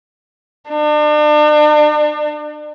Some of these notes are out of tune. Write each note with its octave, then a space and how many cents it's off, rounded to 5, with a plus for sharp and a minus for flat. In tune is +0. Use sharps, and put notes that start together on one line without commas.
D4 +40